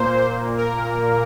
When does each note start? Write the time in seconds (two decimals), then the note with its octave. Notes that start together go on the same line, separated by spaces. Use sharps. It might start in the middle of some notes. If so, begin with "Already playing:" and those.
Already playing: A#2 A#3 C5
0.58 A#4